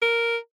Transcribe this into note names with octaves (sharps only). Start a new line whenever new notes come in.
A#4